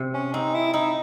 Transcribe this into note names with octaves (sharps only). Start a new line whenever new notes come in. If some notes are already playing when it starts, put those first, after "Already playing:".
Already playing: C3
C#4
C4 D#4
E4
D#4 E4